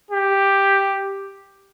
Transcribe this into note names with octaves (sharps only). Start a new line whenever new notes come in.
G4